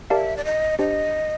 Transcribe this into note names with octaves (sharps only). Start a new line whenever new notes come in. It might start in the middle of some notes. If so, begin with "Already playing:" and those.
G4 A#4 D5 E5 F5 A5
D5
D#5
D4 G4 C5 D#5